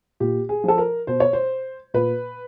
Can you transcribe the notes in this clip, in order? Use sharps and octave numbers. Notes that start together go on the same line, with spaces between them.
A#2 G4
G#4
F3 A4
A#4
B2 C5
C#5
C5
A#2 B4